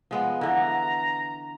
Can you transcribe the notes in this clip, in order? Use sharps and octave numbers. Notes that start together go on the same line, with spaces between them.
F3 G#3 B3
D3 E3 B3 A#5